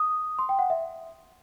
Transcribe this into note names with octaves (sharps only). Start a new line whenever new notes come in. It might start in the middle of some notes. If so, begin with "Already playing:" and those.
Already playing: D#6
C6
G5
F#5
E5